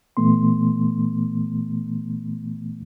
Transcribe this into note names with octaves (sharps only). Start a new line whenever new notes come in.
A#2 E3 A3 B3 C6